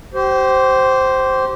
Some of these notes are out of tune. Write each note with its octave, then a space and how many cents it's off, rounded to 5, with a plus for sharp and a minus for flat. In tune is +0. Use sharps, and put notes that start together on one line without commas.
G4 -35 C5 +0